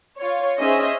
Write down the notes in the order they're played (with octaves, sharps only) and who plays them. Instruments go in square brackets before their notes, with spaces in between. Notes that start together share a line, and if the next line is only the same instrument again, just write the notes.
[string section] F4 C#5
C#4 D#4 G#4 C5 D#5 E5